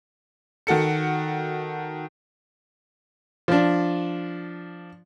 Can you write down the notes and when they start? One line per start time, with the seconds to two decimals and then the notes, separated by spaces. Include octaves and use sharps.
0.67 D#3 F#4 A4 C#7
3.48 F3 D4